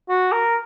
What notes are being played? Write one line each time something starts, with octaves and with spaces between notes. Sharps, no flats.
F#4
A#4